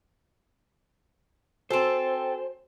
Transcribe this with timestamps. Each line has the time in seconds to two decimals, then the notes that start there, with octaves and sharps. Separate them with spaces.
1.70 C4 F#4 A4 C5 G#5 E7